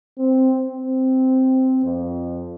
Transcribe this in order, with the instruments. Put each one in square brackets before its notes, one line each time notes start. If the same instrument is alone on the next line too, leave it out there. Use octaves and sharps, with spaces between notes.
[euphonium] C4
C4
F2